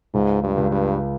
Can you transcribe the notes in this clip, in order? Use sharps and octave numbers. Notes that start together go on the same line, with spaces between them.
C#2 G#2
G2
C#2
G2